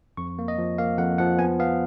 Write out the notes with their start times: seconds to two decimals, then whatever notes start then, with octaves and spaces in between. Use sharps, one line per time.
0.17 F2 C#6
0.39 A#3
0.48 D#5
0.58 F3
0.78 A#3 F5
0.98 F2 F#5
1.18 F3 F#5
1.39 B3 G#5
1.59 B3 F5